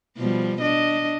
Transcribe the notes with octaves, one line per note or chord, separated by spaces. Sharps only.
B2 F3 G3
D4 D#5